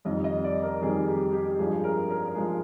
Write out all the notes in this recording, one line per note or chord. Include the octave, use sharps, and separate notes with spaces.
F2 D#3 G3 D#5
D#5
D5
A#4
F2 D#3 G3 G#4
G4
G4
G2 F3 G#3 G#4
A#4
A#4
A#4
F3 G#3 G#4